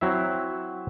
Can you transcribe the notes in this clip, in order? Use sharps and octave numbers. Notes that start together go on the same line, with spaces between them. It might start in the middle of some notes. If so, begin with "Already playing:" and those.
F#3 C4 E4 E5